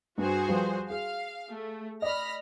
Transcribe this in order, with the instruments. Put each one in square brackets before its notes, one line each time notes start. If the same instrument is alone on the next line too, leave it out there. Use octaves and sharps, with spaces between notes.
[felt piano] G2 [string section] F#4 G#4 C5
[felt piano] F3 G3 B4
[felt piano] G#4 [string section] F5
[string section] A3
[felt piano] D5 D#5 [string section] B5 F6 A#6